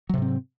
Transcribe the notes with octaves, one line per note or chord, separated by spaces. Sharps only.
G#2 C3 F#3 C4